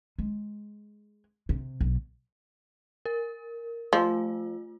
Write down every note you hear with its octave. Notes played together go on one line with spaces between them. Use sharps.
G#3
C3
B1
A#4
F3 A3 F4